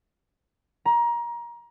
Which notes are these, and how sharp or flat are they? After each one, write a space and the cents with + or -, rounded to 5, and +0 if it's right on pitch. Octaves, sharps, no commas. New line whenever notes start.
A#5 +25